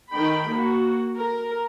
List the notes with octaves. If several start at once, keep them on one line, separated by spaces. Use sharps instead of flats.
D#3 G5 B5
A#3 F#4
A#4